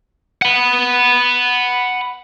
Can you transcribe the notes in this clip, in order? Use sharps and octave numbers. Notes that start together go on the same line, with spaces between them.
F#5 B5